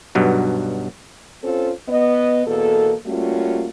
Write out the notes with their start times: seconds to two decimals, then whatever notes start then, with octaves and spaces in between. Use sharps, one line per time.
0.15 B1 G2 B2 F#3
1.43 C4 C#4 F4 A4 C5
1.89 B3 D#5
2.47 E2 B2 A#3 A4
3.06 G3 A3 A#3 C#4 F4 F#4